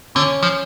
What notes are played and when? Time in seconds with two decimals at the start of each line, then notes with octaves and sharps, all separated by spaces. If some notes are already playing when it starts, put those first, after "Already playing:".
0.16 D3 C#4
0.43 F3